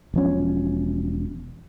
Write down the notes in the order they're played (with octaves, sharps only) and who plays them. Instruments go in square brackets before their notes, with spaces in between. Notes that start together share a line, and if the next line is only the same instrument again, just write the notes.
[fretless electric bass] E1 F3 C#4